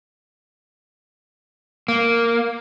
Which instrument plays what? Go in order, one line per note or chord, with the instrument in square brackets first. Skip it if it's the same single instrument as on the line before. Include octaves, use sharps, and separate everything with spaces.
[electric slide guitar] A#3